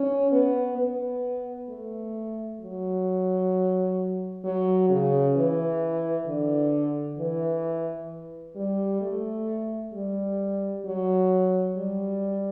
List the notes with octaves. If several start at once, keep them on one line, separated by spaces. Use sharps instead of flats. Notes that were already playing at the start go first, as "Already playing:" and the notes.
Already playing: C#4
B3
B3
A3
F#3
F#3
C#3
E3
D3
E3
G3
A3
G3
F#3
G3